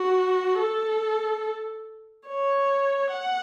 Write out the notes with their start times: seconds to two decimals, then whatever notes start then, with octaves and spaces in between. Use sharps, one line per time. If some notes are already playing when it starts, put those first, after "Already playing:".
Already playing: F#4
0.59 A4
2.28 C#5
3.12 F#5